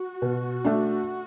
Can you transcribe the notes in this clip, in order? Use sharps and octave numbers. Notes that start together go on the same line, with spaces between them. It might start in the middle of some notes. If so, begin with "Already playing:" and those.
Already playing: F#4
B2
A3 D4